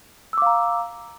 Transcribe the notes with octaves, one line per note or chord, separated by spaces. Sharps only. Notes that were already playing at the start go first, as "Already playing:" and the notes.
F5 A#5 D6 E6